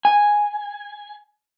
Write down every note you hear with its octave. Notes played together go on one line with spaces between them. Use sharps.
G#5